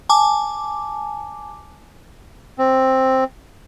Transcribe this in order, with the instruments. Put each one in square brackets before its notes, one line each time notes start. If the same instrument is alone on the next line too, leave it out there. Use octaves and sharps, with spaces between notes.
[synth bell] G#5 A5 D6
[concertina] C4